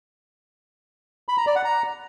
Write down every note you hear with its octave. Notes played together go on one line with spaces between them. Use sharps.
B5
A#5
D5
F#5
A#5